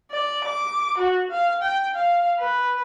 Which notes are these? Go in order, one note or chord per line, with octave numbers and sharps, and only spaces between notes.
D5
D6
F#4
F5
G5
F5
B4